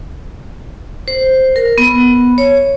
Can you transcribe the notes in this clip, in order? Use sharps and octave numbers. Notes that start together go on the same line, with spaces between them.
C5
A#4
B3
C#5